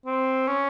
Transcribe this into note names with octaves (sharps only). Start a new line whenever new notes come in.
C4
C#4